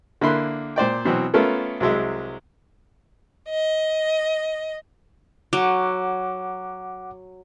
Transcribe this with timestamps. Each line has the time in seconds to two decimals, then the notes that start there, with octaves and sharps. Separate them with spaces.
0.21 D3 A#3 E4 B5 C6 F#6
0.76 A#2 C5 D5 G5
1.05 B2 E3 F#3 C4
1.34 A3 B3 C#4 F4 A4 A#4
1.80 C2 F#3 G#3 E5
3.49 D#5
5.53 F#3 F#5 D6